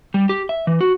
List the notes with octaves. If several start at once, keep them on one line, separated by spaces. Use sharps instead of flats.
G3
G4
E5
E3
F#4